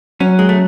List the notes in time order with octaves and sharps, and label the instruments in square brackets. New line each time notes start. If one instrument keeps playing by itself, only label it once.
[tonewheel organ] F#3 [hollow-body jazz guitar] C#4
[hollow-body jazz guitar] G#3
A3